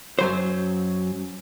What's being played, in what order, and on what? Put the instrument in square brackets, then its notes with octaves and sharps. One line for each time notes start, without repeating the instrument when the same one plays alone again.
[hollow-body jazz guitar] F#2 F#3 C5